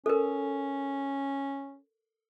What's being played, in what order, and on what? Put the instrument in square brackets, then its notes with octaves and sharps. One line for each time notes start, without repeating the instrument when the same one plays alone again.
[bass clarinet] C#4 [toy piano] A4 A#4